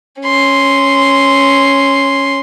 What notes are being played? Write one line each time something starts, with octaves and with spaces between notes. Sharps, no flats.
C#4 C6